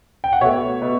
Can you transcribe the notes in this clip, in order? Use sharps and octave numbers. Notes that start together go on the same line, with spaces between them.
G5
F#5
B2 A3 C#5 E5
B2